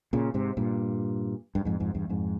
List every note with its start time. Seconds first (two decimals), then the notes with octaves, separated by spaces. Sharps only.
0.13 A#2 C#3
0.34 G#2 C3
0.57 G2 A#2
1.55 G2
1.65 F2 G#2
1.80 F2 G#2
1.95 E2 G2
2.09 F2 G#2